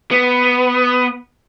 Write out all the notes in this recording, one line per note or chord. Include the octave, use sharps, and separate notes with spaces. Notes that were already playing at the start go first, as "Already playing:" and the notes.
B3